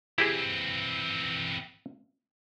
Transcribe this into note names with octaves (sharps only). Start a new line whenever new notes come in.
E3 C4 E4 G4 G#4